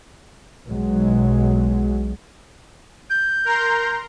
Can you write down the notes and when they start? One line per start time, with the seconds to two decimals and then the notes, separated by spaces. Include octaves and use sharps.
0.68 B1 F#3 G#3
3.10 G6
3.45 A#4 A#5 C6